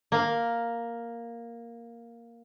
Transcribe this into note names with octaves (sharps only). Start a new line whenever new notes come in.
A#3 F5